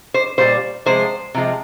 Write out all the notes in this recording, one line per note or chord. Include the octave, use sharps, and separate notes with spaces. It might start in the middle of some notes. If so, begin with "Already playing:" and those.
C5
A#2 G3 C5
C3 F3 G#3 C5
C3 F3 G#3